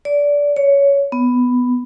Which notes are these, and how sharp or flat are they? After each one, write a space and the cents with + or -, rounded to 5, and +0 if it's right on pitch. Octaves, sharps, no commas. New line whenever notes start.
D5 -20
C#5 +15
B3 +5